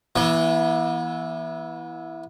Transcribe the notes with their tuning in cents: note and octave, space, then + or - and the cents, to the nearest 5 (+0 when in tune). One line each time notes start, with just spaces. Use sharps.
E3 +0 B3 -40